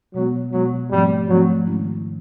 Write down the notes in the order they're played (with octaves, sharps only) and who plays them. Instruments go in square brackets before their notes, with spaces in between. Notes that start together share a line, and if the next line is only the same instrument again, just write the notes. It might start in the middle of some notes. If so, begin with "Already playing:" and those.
[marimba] B2 G#3 B3 [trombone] F#3
[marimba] B2 G#3 B3 [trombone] F#3
[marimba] G#2 F3 A3 C4 [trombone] G3
[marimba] G#2 F3 A3 C4 [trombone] F#3
[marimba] G#2 D#3 G#3 C#4 E4